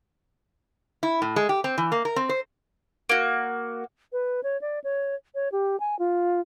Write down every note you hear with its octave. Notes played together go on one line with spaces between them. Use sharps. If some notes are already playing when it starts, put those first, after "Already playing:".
E4
A2
G#3
G4
C4
E3
A#3
A#4
C4
C5
A#3 F#4
B4
C#5
D5
C#5
C#5
G4
G#5
F4